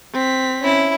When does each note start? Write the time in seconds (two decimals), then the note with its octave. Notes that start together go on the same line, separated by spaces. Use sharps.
0.14 C4 B6
0.61 C#4 E4